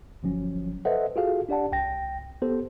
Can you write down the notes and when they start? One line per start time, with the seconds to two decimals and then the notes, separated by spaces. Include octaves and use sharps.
0.23 G1 F3 F#3 C#4
0.85 A4 B4 C5 D#5 E5 F#5
1.16 F4 F#4 G#4 A4 F5
1.49 D4 G4 D5 F#5 A5
1.72 C2 G5 A#6
2.42 B3 G4 A4 C5